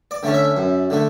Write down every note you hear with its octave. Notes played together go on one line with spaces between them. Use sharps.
D5
D3 A3 C#4
E5
F#2
D3 A3